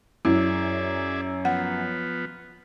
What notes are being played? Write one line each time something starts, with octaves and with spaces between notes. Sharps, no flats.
F#2 E4 G#4 D5 E5
F3 B3 F#5